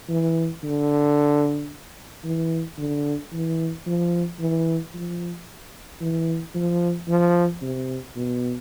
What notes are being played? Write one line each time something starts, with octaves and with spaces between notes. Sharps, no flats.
E3
D3
E3
D3
E3
F3
E3
F3
E3
F3
F3
C3
B2